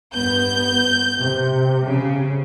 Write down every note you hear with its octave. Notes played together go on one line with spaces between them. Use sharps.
G2 B3 G6
C3
C#3